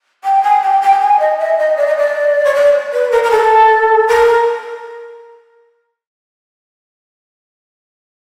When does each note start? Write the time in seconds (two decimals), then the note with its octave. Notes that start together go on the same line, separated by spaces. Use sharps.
0.24 G5
0.43 G#5
0.62 G5
0.82 G5
1.00 G#5
1.19 D#5
1.39 E5
1.58 D#5
1.77 D5
1.87 D#5
1.97 D5
2.45 C#5
2.54 D5
2.93 B4
3.11 A#4
3.23 A#4
3.31 A4
4.08 A#4